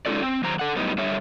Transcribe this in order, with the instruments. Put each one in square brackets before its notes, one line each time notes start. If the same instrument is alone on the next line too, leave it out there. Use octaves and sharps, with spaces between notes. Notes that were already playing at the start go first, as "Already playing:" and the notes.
[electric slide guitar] G#3 C#4 D#4 F4 A4 D5
C4
F#2 D#3 C5 A#5
A4 F#5
F#2 A2 G3 B3 D#4
D3 G3 C#5 E5